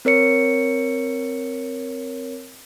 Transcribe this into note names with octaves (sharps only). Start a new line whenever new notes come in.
C4 A#4 C#5 C#7